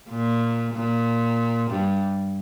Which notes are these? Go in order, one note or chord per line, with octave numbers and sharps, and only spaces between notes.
A#2
A#2
G2